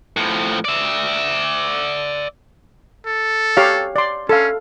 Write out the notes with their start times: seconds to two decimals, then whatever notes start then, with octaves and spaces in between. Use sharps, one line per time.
0.17 A2 F3
0.65 D5 E5
3.06 A4
3.57 G4 C#5 F5
3.96 D5 C6
4.29 C#4 A4 F5